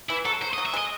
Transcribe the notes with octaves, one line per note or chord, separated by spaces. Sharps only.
E3 E4
F#3 A4
F#3 C5
D#5
F#3
E5
G#3 D#5